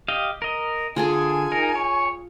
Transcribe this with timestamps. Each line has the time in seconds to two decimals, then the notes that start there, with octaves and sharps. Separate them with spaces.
0.08 G4 D#5 F5
0.42 A#4 D#5
0.96 D3 F4 G#4 A4 G#5
1.52 D#4 A#4
1.75 C#5